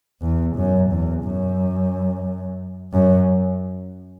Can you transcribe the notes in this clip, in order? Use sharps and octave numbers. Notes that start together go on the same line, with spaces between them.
E2
F#2
E2
F#2
F#2